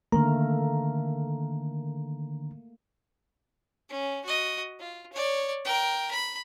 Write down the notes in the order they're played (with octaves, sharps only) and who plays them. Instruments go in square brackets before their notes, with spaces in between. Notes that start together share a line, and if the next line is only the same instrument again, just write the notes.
[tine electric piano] D3 D#3 A#5 [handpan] A3 A#3 A#4
[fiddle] C#4
F#4 D#5
F4
C#5 D5
A#4 G5
B5